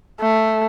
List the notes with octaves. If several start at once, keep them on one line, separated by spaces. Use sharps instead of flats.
A3